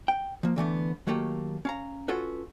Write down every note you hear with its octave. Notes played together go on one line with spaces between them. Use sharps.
G5
F3 A#3
D3 E3 A3 B3
D#3 F#3 A3 A#3 G4 A4
C#4 F5 A#5
C#4 F4 F#4 A4 B4